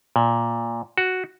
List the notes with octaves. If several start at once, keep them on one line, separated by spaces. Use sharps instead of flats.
A#2
F#4